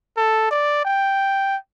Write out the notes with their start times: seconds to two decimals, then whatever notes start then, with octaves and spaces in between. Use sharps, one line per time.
0.18 A4
0.51 D5
0.85 G5